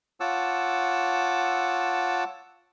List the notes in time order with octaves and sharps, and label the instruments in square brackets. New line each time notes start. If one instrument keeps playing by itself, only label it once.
[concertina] F4 C#5 F#5 A5 D6 E6